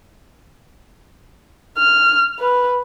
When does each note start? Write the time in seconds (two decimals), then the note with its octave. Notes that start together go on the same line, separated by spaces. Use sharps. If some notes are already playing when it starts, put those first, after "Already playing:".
1.78 F6
2.39 B4